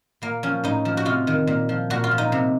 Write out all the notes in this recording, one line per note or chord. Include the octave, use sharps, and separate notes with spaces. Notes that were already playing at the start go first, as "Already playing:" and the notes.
A#2 A#3
F3 C#4
A2 D#4
F3
F#4
C3 F4
D#3
A#2
F3
A#2 F#4
F4
F3
D#4
C3